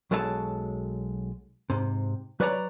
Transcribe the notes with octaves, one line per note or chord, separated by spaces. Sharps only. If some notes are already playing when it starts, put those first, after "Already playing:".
B1 F#3 G#3 A4 D5 A5
G#2 C3
F#3 B4 C#5 D5 G#5 A#5